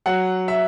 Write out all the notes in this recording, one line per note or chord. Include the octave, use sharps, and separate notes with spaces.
F#3 F#5
E5